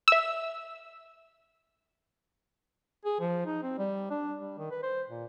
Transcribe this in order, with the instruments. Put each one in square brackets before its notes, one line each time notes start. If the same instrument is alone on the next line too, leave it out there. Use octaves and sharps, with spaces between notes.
[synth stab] E5 E6
[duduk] G#4
F3
D#4
C4
G3
D4
G3
D#3
B4
C5
A#2